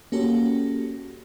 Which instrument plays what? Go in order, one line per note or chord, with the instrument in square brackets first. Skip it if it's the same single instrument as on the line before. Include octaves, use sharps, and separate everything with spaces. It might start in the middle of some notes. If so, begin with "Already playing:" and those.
[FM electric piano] A#3 C#4 F#4 G4 A4